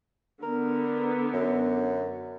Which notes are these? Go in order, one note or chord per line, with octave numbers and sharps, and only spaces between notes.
D3 B3 A#4
F#2